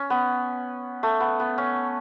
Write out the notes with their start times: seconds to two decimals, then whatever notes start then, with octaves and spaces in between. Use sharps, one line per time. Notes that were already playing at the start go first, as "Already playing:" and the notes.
Already playing: C#4
0.10 B3
1.03 A3
1.20 B3
1.40 B3
1.58 C#4